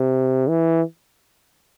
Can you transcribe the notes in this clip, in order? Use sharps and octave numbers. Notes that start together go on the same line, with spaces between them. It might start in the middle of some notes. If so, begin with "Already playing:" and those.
Already playing: C3
E3